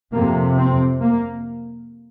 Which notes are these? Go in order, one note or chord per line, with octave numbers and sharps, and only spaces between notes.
F2 C3 A#3
C4
A#3